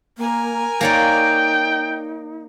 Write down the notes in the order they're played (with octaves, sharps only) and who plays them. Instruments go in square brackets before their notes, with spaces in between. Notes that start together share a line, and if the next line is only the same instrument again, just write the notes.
[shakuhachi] A#3 [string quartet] A#4 G#5
[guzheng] A#3 C#5 D5 [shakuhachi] D#4 [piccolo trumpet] G5